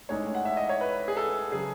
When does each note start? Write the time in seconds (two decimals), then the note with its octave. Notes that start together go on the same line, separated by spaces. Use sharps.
0.09 A1 A2 G#3 D#4 C#5
0.35 F#5
0.45 E5
0.57 D#5
0.69 C#5
0.81 B4
1.08 G#4
1.17 A4
1.52 C#3 F#3 G#4